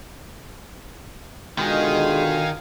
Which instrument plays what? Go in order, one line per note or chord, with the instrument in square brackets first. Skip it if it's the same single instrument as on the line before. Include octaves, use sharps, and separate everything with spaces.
[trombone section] B2 D3 F4 [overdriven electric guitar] D#3 [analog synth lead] G#3 [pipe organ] F5 G#5